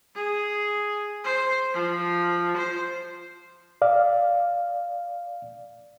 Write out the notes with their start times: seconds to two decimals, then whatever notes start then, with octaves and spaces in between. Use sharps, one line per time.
0.15 G#4
1.24 C5
1.74 F3
2.57 C5
3.82 D5 F5